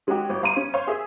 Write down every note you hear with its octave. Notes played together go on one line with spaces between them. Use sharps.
D#3 G#3 C#4 D#4 F#4 G4
G1
G1 F5 A#5 C6 D#7
C#4
C5 C#5 F5 C#6
G#4 E5